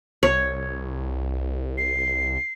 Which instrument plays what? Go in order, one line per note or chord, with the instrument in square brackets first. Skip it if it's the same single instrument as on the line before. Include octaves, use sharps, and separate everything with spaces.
[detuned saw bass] C2 [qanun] C#5
[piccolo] C7